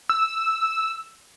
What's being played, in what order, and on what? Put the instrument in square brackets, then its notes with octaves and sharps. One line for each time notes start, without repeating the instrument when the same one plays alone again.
[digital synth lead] E6